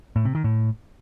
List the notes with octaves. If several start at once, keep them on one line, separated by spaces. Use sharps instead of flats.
A2
C3
D#3
A2